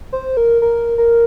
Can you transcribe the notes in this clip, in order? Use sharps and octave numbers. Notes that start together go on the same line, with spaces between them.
C5
A#4
A#4
A#4